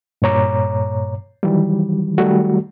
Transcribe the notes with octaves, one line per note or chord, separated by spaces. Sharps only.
G2 A#2 C#5 A#5 D6
D#3 E3 F#3 G3
D#3 F#3 G3 A3 F#4